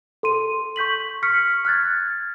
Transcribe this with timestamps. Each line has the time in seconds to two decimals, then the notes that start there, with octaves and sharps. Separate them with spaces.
0.23 A4 C6 D#7
0.76 C#6 G6 B6 F#7
1.23 C#6 F6 B6 C#7
1.65 F6 F#6 G#6 A6